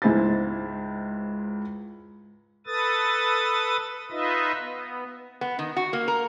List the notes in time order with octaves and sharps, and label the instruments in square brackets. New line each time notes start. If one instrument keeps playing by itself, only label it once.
[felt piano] C#2 G#2 E4 C5 G#5 A6
[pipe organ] A4 B4 D#6 A6
D#4 F4 B4 D#5 E5
B3
[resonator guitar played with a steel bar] B3
D#3
F#4
A#3
A#4